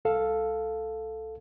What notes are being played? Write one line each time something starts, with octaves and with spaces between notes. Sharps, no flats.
C2 A4 F5